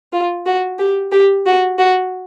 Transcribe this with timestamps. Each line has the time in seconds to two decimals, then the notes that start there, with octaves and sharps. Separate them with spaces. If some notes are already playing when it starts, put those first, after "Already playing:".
0.13 F4
0.46 F#4
0.79 G4
1.12 G4
1.46 F#4
1.78 F#4